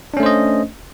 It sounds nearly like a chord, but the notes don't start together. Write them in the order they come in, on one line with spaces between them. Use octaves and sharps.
D4 C#4 A3 C5 D#5